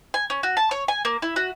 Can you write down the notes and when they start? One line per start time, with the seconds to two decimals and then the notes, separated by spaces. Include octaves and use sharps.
0.14 G#5
0.30 C#4
0.43 F#4
0.57 A5
0.71 C#5
0.88 G#5
1.05 A#3
1.22 E4
1.36 F#4